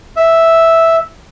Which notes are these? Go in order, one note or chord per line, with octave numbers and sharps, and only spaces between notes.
E5